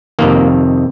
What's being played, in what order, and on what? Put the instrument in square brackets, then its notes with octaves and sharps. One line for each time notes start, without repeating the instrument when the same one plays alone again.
[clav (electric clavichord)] F2 C3 D#3 A#3